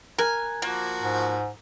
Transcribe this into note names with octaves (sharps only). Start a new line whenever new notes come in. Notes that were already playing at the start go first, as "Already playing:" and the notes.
A#4 G#5 F#6
F3 A#3 F#4
G#2